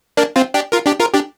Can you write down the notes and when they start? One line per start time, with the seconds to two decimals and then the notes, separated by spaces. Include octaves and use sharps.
0.17 A#3 D4
0.36 C4 F4
0.54 D4 G4
0.72 F4 A#4
0.86 D4 G4
1.00 F4 A#4
1.14 D4 G4